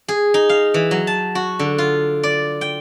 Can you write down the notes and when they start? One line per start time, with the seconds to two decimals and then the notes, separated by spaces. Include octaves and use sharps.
0.08 G#4
0.34 D#4
0.49 F5
0.74 E3
0.91 F#3
1.07 A5
1.35 F#4
1.59 D3
1.78 F4
2.23 D5
2.61 G5